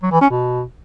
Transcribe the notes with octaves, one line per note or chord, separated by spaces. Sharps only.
F#3
E3
C#4
B2